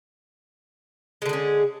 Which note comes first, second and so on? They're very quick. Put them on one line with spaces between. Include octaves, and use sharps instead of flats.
G#3 D3 G#4 C#4